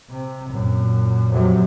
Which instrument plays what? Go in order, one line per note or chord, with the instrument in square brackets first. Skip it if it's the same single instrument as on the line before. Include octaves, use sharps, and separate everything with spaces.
[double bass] C3
F#2 A#2
[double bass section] F2 C3 F#3